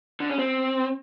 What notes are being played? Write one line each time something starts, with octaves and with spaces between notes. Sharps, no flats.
D3
C#4
C4